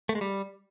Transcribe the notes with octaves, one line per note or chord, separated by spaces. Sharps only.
A3
G#3
G3